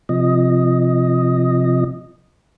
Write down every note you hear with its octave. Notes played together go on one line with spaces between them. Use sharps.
C3 F3 D#5